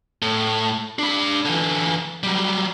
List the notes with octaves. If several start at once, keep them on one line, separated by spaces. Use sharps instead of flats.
A2
D4 B5
D3 E3
F#3 G3